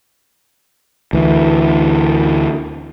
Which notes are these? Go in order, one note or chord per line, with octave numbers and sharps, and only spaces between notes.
D2 E3